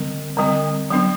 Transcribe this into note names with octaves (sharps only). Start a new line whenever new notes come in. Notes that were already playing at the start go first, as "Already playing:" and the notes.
Already playing: D3 G3 C4
D3 G3 C4
F#3 B3 D4